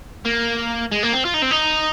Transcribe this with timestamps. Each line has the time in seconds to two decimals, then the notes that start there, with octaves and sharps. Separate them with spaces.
0.25 A#3
0.92 G#3
1.03 A#3
1.13 C4
1.25 F4
1.34 D#4
1.42 C4
1.51 D#4